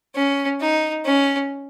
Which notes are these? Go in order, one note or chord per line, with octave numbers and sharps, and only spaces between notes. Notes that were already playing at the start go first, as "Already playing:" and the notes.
C#4
D#4
C#4